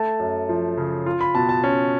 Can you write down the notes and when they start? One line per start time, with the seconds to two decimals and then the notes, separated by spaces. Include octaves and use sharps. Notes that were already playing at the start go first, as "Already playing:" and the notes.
Already playing: A3 A5
0.20 F#2
0.49 F3
0.77 C#3
1.06 F4
1.21 B5
1.35 B2 A5
1.49 A5
1.64 C#4